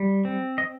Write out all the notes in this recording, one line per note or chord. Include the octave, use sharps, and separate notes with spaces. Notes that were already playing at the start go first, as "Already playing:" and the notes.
Already playing: G3
C4
D#5